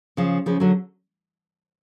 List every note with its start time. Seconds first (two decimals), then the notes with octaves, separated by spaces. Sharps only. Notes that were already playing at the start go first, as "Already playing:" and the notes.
0.17 C#3 F3
0.46 C#3 F3
0.60 D3 F#3